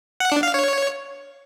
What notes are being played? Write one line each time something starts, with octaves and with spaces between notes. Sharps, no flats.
F#5
D4
F5
C#5